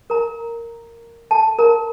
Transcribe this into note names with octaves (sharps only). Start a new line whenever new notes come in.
A#4 A#5
A4 A5
A#4 A#5